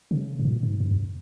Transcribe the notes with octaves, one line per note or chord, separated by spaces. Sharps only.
C#3
G#2
A#2
G#2
F#2
F2